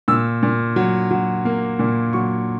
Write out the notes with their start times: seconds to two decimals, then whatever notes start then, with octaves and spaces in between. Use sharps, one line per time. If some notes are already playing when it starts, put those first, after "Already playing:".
0.08 A#2 E6
0.43 A#2
0.76 F#3
1.11 F#3
1.45 A#3
1.79 A#2
2.13 F#3 C#6